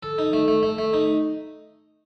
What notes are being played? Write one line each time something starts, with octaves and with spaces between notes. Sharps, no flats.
A4
D#4
A3
A3
A3
A3
D#4